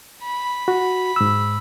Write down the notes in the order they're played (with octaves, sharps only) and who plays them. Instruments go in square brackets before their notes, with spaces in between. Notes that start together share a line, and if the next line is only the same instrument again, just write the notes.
[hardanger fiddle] B5
[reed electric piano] F#4
G#2 E6